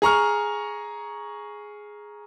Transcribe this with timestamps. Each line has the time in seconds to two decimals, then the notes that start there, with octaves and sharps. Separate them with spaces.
0.02 G#4 A#5 C#6 F6